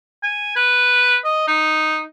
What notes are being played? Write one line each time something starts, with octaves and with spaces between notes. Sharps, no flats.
G#5
B4
D#5
D#4